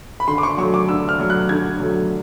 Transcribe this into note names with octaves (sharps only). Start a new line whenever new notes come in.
B5
D3 C6
D6
C#6
F#3 A3 C#6
D6
D3 E6
F6
F#3 A3
F#6
D3 G#6
F#3 A3